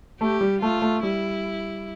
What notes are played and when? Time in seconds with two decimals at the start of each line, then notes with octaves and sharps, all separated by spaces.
0.21 A3 G4
0.41 G3
0.62 A3 F4
0.82 A3
1.03 G3 E4